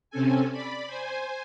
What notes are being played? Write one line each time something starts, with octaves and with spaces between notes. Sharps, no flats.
C3 C4 C#4 A4 G#5
D5 B5
C5 G#5